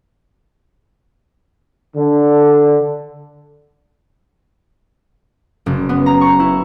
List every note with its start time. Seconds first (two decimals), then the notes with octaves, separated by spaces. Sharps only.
1.96 D3
5.66 F#1
5.89 B3
6.06 A#5
6.21 C#6
6.40 E4